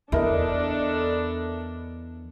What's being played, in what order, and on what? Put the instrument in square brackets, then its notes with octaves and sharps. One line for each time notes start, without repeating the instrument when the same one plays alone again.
[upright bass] E2 [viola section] D4 A4 [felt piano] E4 A#4 D#5